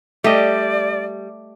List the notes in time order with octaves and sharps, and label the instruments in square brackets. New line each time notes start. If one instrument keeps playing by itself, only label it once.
[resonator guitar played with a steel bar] G3 [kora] A3 G4 D#5 [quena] D5